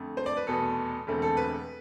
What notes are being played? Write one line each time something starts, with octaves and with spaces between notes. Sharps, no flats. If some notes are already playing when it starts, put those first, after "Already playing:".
Already playing: F2 D3 A3
C5
D5
B4
F1 E2 B2 B3 A4
E1 E2 D3 A3 C4
A4
B4